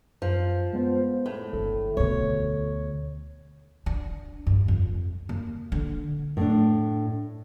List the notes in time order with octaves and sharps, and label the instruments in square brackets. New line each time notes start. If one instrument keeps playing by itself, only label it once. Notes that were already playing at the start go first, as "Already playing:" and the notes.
[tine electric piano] F#2 [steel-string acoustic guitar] F3
[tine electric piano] G#3 B3 C5
[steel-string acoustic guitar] A2
[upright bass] G1 [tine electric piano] A4
[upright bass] D2 B2 [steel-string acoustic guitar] C#5
[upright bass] D4
G2
F2
A#3
D3
[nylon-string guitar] A2 D4